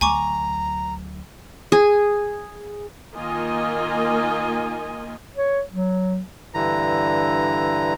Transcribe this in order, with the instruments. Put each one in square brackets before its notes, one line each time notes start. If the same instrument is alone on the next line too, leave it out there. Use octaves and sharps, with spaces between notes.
[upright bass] D2 F#3 [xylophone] G#5 C#6 D6 [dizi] A#5
[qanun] G#4
[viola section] D#3 A#3 F4 D#5 G#5
[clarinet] C#5
F#3
[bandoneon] G2 D3 E3 A#5